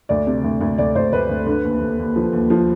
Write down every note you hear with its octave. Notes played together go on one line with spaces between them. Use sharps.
D2 D5
C3
D2
D2
D2 D5
D2 C5
D2 B4
D2
D3
D#2
D#2
D#2
F3
D#2
F3